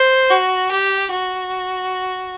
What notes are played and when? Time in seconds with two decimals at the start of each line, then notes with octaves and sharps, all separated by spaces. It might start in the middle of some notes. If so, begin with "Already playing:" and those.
Already playing: C5
0.31 F#4
0.71 G4
1.10 F#4